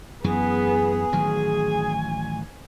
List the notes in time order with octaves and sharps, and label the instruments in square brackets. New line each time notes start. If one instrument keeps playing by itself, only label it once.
[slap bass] F#2 E3 [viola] B3 [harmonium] G#4
[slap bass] A1 D#3 F#3 [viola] G#5